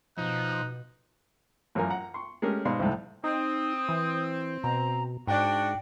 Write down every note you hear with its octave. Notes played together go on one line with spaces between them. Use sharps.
B2 F3 D#4 F#6
A1 F#2 F4 A#4 G#5
F#5 A#5
C6 C#6
G#3 A3 C#4 G4 A#4
G#2 B2 D5 F5 C6
C2 F2 G#2 C3 G3 A3
C4 D#4 D#6
E3
B2 A#5
G#2 D4 F#4 G5